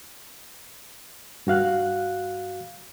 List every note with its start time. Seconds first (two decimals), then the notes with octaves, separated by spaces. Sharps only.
1.47 G2 F#4 F5 F#6